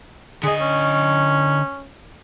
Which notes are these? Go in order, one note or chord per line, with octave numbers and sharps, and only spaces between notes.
D3 G#4 D#5
C#4